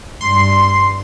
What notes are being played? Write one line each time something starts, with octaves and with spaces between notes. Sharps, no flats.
G2 C6